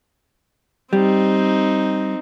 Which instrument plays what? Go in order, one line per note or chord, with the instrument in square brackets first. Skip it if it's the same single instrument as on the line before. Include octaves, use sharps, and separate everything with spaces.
[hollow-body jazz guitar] G3 [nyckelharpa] C4 D#4